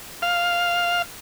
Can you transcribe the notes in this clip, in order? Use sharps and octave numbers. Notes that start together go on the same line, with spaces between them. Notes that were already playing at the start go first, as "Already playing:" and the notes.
F5